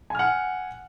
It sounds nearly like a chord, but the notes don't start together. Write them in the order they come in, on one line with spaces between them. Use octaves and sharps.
G#5 F6 F#5